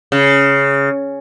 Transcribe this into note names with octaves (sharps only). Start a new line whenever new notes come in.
C#3